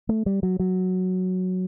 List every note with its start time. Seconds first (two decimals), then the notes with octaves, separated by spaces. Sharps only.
0.09 A3
0.26 G3
0.43 F#3
0.60 F#3